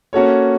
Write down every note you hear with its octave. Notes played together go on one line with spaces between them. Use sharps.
A#3 C#4 F#4 A4 C#5